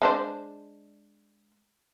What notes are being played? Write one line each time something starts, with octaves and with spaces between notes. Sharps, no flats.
G#3 D4 C5